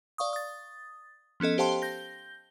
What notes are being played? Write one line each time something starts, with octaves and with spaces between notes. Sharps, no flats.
D5 F5 C#6 D#6
D#6 A6
F3 B3 C#4 A4 D#5
G4 C5 F5 G5 A5 C6
G6 A#6 G7